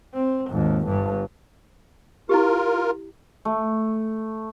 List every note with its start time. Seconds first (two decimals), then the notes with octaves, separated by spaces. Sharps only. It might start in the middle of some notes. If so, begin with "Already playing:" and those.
0.14 C4
0.50 G#1 D#2
0.86 G1 G2
2.29 E4 F4 G4 A#4
3.45 A3